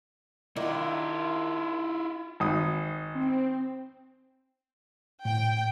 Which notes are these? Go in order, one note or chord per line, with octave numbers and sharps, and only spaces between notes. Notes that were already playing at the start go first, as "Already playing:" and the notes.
D#3 D4 E4 F4
G#1 D#6
C4
A2 G5